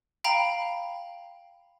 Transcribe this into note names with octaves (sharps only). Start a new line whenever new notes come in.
F5 G5 A#5 B5